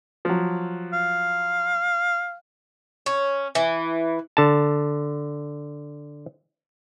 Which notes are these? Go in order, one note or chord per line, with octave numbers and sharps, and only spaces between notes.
F3 F#3
F5
C#4
E3
D3 A5